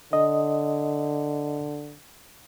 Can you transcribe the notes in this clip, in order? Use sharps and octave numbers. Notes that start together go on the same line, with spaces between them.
D3 D#5